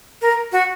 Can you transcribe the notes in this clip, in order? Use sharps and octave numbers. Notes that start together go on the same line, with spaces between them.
A#4
F#4